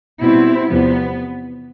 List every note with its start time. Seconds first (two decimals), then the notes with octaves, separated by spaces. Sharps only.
0.21 B2 G3 C4 E4
0.69 E2 C3 F3 B3